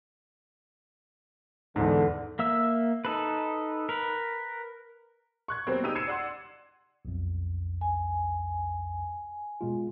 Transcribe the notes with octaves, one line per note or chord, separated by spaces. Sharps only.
E2 G#2 D3
A#3 E5 E6
D#4 A4 B4
A#4 B4
C#6 F#6 G#6
B2 F#3 G3 A#3 C4
C#3 D#4 G4 E6 D#7
E6 G#6 C7 C#7 D#7 E7
D5 F#5 C6
B1 F2
G#5
B2 G#3 F4